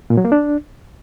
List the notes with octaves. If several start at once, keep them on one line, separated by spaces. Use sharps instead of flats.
A#2
F#3
A#3
D4